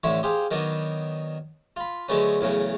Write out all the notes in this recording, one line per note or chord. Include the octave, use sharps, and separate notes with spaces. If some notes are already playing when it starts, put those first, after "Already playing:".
A1 A2 D3 C#5 E5
G4 G#4 C5 F5
D#3 F#3 B3 D4 D#4
F4 B5
D3 F#3 G#3 A3 B3 C#4
E2 A2 C#3 F#3